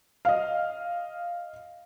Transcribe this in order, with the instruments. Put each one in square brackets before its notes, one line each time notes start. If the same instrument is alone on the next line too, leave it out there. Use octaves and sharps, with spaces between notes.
[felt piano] D#5 F5